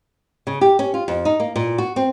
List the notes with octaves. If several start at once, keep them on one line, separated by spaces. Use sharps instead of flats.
C#3
G4
C#4
F4
F2
D#4
A#3
A#2
F#4
C4